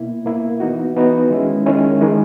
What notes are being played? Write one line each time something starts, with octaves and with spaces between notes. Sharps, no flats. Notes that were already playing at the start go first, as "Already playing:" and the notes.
Already playing: B2 A#3 E4
B2 A#3 E4
E3 B3 D#4 F#4
E3 B3 D#4 F#4
D#3 G#3 C#4 E4
D#3 G#3 C#4 E4
D#3 G#3